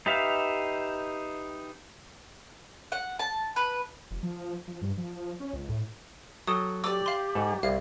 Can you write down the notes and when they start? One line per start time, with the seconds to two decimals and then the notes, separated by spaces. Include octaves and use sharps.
0.06 D#4 G4 B4 E5 F5
2.92 F#5
3.19 A5
3.56 B4
4.11 F1
4.23 F3
4.68 F3
4.81 G2
4.97 F3
5.40 C#4
5.53 C#2
5.69 A2
6.47 F#3 A4 G5 D#6
6.84 G4 D5 D6 E6
7.06 F5 C6
7.35 G#2 A4
7.63 C2 F5